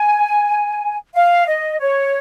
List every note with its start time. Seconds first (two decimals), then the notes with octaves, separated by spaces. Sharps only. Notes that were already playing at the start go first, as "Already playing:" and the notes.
Already playing: G#5
1.15 F5
1.47 D#5
1.80 C#5